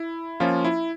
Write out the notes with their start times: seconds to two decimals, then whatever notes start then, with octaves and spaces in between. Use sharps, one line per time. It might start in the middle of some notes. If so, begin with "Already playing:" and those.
Already playing: E4
0.40 F3 A#3 C#4 F4
0.65 E4